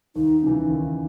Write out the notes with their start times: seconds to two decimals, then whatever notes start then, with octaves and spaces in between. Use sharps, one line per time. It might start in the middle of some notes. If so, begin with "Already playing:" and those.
0.16 D#2 D#4
0.43 C#3 E3
0.70 D#2